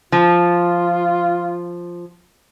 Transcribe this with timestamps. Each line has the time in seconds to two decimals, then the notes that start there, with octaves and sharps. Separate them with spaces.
0.12 F3 F4